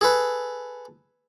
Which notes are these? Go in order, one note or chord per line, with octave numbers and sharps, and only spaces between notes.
G#4 A4 B4